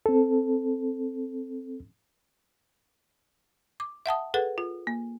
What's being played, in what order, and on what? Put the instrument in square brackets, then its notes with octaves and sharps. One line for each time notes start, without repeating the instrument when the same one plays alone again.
[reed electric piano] C4 A4
[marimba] D6
E5 F#5 A5 D#6
G#4 A4 B4 F#5
F4
A#3